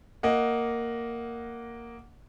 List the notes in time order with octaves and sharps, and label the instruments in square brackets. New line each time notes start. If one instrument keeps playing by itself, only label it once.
[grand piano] A#3 D#5 F#5